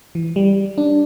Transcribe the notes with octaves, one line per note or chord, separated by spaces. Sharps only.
E3
G3
D4